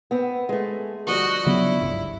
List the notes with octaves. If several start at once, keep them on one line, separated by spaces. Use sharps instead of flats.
B3 C4
G#3 A3
D3 F3 G3 F#4 D#5
C#3 F#3 B3 E4
G1 C#2 G2